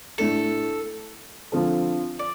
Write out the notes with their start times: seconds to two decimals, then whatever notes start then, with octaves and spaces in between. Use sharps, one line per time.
0.18 A2 A3 D4 A4
1.52 D3 F3 C4 F4 A4
2.19 D5